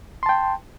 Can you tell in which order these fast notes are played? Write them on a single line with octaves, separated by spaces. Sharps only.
C6 A5 G5